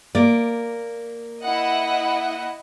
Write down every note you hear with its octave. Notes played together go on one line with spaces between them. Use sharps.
A#3 D5
E4 D#5 F#5